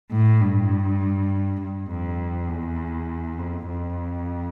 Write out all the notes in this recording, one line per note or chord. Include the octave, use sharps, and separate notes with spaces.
A2
G2
G2
F2
E2
F2
F2